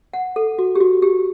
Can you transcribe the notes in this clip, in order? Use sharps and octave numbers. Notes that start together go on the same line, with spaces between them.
F#5
A4
F#4
G4
F#4
G4